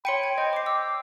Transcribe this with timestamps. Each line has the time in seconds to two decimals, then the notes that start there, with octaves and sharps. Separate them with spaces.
0.05 C#5 G5 B5 C6 C#7 D#7
0.23 G#6
0.38 C5 D#5 G5
0.53 D6 C7
0.66 D6 E6